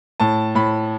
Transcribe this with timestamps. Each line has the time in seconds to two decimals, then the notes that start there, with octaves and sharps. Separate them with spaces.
0.20 A2 A5
0.55 A2 B5